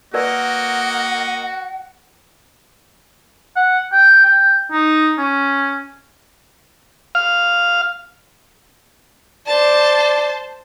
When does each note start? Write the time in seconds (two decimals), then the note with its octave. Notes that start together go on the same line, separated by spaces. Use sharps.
0.14 A#3 F#4 A#4 B4 D5 D#5 F#5
3.56 F#5
3.92 G5
4.25 G5
4.72 D#4
5.18 C#4
7.15 F5
9.47 C5 D5 A5